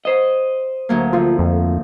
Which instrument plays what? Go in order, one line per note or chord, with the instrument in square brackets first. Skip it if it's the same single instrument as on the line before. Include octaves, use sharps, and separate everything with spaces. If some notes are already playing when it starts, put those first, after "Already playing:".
[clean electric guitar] C5 D#5
[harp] D2 F#3 A#3
[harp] D3 F3 [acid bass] F4
[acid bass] F2